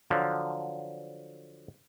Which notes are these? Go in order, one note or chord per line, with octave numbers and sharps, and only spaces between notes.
D3 F3 F#3